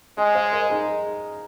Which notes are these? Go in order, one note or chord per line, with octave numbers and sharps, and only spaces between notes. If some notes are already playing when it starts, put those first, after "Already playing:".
G#3 D#5 G#5
C5 F5
A#4 D#5
D#4 G#4